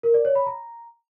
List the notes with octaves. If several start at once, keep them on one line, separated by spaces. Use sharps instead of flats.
A#4
D5
C#5
B5
A#5